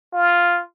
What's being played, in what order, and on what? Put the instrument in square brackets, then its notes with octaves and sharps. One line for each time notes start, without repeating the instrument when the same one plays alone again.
[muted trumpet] F4